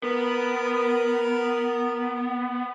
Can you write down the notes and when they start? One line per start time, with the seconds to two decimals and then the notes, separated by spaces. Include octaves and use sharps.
0.03 B3 A#4